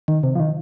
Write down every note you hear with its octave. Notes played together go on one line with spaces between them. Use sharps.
D#3
C3
F3
D#3